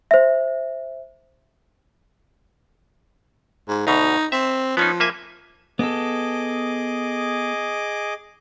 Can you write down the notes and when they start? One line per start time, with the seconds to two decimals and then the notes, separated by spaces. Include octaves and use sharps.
0.11 C5 E5
3.68 G#2
3.87 D2 B2 D#4
4.32 C4 E5
4.77 F3 B3 C#4 D#4
5.00 A#3 E5 G#5
5.79 B3 G#4 A4 D#5 D6